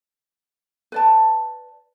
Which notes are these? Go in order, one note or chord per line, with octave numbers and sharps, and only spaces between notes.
B4 D5 A5